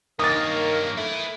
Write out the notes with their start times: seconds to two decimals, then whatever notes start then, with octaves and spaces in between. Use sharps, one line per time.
0.19 G2 D#3 A#3 A#4 C#5 D#6 A6
0.97 A3 E4 B4